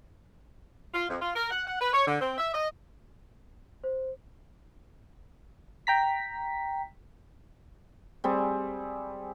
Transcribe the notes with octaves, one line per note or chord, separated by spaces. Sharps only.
F4
F2
F4
A#4
F#5
F#5
B4
C#5
D3
C4
E5
D#5
C5
G5 A#5 B6
G3 C4 G#4